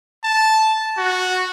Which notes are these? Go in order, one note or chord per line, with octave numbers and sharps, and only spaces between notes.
A5
F#4